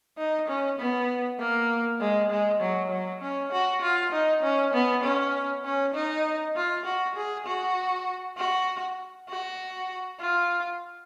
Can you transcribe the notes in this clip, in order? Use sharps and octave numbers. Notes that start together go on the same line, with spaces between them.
D#4
C#4
B3
A#3
G#3
G#3
F#3
F#3
C#4
F#4
F4
D#4
C#4
B3
C#4
C#4
D#4
F4
F#4
G#4
F#4
F#4
F#4
F4